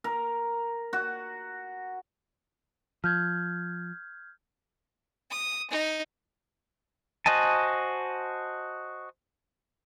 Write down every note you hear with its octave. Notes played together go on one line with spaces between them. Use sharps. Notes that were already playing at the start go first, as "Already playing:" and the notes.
A#4
F#4
F3 F6 G6 G#6
D#6
D#4
F#4 C5 D#5 G#5 A5